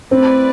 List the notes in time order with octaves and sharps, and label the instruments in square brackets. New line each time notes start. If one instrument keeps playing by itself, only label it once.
[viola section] A3 E4 B4 D5 [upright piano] C4